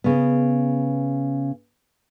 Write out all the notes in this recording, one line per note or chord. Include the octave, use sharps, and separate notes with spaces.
C#3 B3